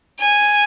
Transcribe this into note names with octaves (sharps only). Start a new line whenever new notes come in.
G#5